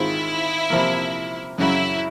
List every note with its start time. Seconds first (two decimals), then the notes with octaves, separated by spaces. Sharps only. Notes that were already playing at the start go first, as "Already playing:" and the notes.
Already playing: G#2 D#3 G#3 C4 E4 F4
0.70 C3 F3 A#3
1.58 F#2 C#3 F#3 E4